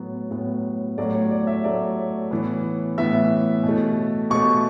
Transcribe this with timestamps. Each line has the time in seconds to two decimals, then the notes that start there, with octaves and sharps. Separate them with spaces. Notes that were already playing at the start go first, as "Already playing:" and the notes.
Already playing: A2 F#3 B3
0.31 A2 F#3 B3
0.98 A2 F#3 A3 D5
1.14 C#5
1.31 D5
1.47 E5
1.64 A2 F#3 A3 D5
2.31 A2 E3 B3
2.98 A2 E3 B3 E5
3.63 B2
3.69 A3
4.30 B2 A3 C#6